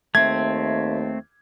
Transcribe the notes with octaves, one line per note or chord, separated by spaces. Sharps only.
D#2 A3 C4 E5 G#6